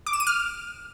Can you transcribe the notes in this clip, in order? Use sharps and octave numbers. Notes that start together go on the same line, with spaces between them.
D6
E7
D#7
F6